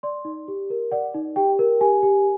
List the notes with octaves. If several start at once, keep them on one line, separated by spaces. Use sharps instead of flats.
D5 C6
D#4
G4
A#4
D5 F#5
D#4
G4 G5
A#4
G4 G#5
G4